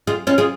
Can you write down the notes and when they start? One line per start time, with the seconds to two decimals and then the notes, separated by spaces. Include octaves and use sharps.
0.07 F4 G#4
0.27 C#4 F4
0.38 F4 G#4